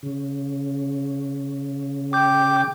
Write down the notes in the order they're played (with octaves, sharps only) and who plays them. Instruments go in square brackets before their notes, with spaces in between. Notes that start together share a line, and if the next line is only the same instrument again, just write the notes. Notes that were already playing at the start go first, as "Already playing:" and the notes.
[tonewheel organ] C#3
[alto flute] G5 [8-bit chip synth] D6 G6